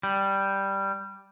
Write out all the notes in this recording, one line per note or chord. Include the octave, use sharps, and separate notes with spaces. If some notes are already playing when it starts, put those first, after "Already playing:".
G3